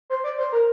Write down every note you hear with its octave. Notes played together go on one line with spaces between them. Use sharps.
C5
D5
C5
A#4